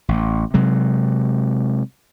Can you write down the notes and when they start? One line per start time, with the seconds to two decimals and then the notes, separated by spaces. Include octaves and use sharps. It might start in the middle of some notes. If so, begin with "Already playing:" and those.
0.09 A1
0.54 C3 F#3 G#3